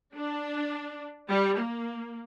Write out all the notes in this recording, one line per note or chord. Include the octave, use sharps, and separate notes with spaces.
D4
G3
A#3